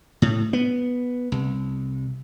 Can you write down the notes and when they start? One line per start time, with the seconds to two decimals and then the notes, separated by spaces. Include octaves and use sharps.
0.22 A2
0.53 B3
1.32 C2